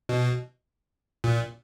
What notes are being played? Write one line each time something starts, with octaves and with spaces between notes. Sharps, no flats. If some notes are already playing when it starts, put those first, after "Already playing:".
B2
A#2